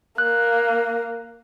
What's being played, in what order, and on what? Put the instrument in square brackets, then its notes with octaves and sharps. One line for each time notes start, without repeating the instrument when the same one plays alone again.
[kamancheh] A#3 [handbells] F#6